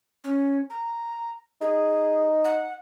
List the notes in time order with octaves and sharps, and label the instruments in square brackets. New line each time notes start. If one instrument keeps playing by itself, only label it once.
[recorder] C#4
A#5
[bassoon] D#4 [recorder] G#4
[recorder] F#5